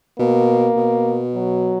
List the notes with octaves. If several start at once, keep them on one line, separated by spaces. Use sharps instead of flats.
B2 A#3
B2
F#3